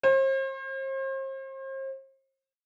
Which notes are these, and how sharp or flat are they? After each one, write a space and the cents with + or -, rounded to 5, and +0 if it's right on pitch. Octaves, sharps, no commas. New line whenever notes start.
C5 +40